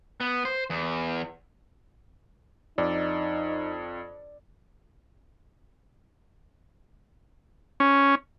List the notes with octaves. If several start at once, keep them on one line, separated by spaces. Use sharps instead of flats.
B3
C5
E2
F2 D#4 D5
C#4